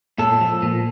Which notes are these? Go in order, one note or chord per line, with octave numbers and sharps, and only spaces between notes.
A#2 A4
F3
A#2